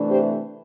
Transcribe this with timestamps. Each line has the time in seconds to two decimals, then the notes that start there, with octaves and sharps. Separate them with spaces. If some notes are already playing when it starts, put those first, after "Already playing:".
Already playing: C3 E3 A3 D4
0.09 G4 C5